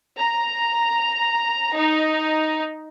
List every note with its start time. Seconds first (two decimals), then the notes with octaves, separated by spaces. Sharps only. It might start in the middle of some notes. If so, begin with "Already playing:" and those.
0.17 A#5
1.76 D#4